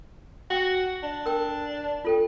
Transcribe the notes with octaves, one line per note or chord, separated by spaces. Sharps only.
F#4 G5
D4
A#4 G5
F4 A4 G5